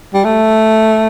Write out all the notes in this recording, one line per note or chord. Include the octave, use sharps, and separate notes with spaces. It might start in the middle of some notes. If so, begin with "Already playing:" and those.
G3
A3